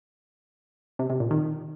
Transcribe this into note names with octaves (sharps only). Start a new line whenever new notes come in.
C3
C3
A#2
D#3